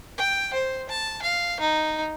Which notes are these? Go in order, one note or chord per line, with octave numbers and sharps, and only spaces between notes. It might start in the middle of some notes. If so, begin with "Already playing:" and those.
G5
C5
A5
F5
D#4